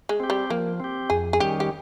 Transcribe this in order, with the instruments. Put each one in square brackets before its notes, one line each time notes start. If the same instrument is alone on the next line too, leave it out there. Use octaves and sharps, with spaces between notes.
[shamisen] G#3
[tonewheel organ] C4 G4
[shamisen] G3
[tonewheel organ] F3 [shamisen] A#3
[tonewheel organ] C4 G4
[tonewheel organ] F2 [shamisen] G#4
[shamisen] G#4
[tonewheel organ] D#3 G3 C#4 [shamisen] G4
[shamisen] G4